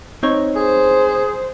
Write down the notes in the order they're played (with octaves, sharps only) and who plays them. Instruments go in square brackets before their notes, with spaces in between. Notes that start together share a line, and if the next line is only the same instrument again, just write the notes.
[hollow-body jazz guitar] C4 D#4 C#5
[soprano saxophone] G#4 [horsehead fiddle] C5